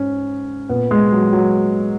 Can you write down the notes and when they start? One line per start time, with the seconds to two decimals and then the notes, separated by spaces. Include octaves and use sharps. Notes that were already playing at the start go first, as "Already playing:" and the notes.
Already playing: G#2 C#4
0.69 A#2 B3
0.91 G#3
1.12 F#3
1.33 F#3